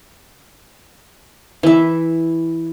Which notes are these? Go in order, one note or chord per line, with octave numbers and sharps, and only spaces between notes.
E3 E5